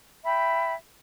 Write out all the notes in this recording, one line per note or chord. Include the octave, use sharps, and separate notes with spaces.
E5 G5 B5